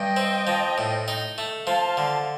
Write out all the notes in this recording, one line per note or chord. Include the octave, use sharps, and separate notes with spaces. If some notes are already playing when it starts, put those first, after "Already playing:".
Already playing: G2 D#5 G5
C4
F3
A2
D#4
A3
F3 F5 A5
D3